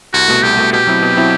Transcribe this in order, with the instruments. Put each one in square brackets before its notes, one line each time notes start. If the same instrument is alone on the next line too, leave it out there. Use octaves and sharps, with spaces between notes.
[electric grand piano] C2 [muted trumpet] F#4
[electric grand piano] B2 A3
[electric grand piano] C2 [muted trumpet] G4
[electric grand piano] B2 A3
[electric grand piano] B2 [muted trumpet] G4
[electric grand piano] F#3 C4 E4
B2
F#3 C4 E4